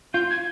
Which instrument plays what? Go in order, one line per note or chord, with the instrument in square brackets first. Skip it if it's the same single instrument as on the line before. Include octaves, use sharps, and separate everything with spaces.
[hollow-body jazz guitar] F4 [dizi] G6
[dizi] G#6